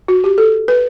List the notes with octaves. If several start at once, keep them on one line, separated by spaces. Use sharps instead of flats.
F#4
G4
A4
B4